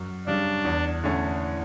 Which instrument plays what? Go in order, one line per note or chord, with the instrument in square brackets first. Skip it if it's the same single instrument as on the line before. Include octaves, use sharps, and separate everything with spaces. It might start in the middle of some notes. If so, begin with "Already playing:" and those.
Already playing: [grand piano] F#2
[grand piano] C#3 G3 [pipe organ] D4
[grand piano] E2
D3 A3 C#4